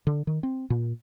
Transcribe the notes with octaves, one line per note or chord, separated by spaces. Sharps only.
D3
D#3
C4
A#2